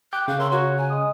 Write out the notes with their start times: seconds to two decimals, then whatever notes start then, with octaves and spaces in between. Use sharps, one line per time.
0.13 G5 D6 F#6 G6
0.28 C#3 F5
0.39 A#4 C#5 E5 C6
0.52 F#4 C#5 F#5 A#5
0.77 G#5
0.90 G#3 D#6